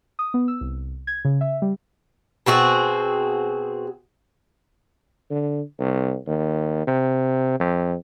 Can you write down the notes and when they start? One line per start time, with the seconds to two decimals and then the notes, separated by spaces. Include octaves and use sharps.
0.19 D#6
0.34 B3
0.48 E6
0.61 C2
1.07 G#6
1.25 C#3
1.41 E5
1.62 G3
2.46 B2 C4 F#4 G#4
5.30 D3
5.79 C2
6.27 D#2
6.87 C3
7.60 F2